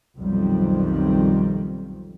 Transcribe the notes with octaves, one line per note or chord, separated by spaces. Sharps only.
B1 F2 A#2 D#3 G3